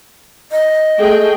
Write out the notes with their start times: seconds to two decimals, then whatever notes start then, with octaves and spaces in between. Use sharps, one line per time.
0.52 D#5
0.99 A3 G#4 G5